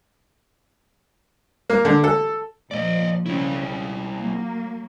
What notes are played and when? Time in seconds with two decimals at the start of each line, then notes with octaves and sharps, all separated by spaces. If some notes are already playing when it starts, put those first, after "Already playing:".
1.70 A#3
1.85 D3
2.04 A4
2.71 A#2 F3 D5 D#5
3.26 C#3 C4 E4
4.18 F#3 A#3